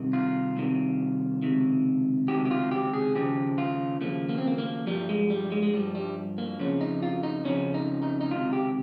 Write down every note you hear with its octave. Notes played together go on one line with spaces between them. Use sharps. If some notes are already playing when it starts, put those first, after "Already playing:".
Already playing: C2 C3 D#3
F4
C2 C3 D#3
C#2 C3 D#3
C#2 C3 D#3 G4
G4
F4
G4
G#4
D#2 C#3 F3 G4
F4
D#2 C#3 F3 A#3
A#3
C4
A#3
A#3
G2 F3 G3
G#3
G3
G#3
G#3
G2 F3 G3
G3
A#3
F2 C#3 F3 C#4
D#4
F4
D#4
F2 C#3 F3 C#4
D#4
D#4
D#4
C#2 C3 D#3 F4
G4